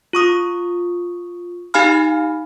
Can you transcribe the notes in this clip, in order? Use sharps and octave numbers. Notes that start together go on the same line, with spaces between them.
F4 C#6 D#6
D#4 G4 F5 G#5 B5 F6